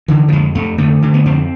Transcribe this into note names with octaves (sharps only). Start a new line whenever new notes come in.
D3 E3
F3
F2 G#3
F2 A3
D3 A3
D3
B3
F2 C4